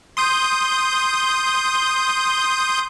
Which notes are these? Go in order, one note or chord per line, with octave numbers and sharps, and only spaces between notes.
C6 D#6 G6